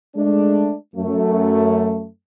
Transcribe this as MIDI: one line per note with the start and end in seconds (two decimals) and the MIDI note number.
0.16 0.74 56
0.16 0.74 57
0.16 0.74 62
0.96 2.05 42
0.96 2.05 57